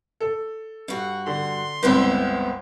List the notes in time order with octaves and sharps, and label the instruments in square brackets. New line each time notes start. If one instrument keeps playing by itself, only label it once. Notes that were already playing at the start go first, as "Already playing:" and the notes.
[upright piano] A4
[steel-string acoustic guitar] G2 F#4
[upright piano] D3 [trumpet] C6
[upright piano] G1 C#2 [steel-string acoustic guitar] B3 C4 E4